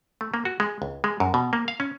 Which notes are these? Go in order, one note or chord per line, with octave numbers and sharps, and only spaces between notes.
A3
A#3
F#4
G#3
C#2
G#3
F#2
B2
A#3
F5
C#4